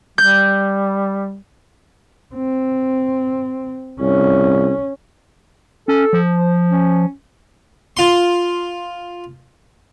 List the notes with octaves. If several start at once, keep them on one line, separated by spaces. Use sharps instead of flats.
G3 G6
C4
C2 C#4
C#4 A4
F3
C5
C#4
F4 C6